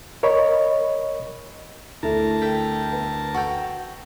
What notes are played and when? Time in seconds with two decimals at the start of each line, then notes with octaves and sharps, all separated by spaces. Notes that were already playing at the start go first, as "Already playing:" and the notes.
0.23 A#4 C#5 D#5 B5 C#6
2.03 D2 A3 E4 A#4 A5
2.42 A4 E5 G5
2.92 B4
3.34 F#4 A4 G5